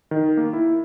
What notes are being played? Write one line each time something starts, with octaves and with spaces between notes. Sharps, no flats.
D#3
A#3
E4